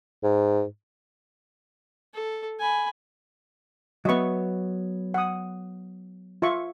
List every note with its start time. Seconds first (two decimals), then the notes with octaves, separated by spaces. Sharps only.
0.23 G#2
2.14 A4
2.60 G#5 B5
4.05 F#3 B3 D#5 E5 C#6
5.14 F#5 D#6
6.42 F4 E5 C#6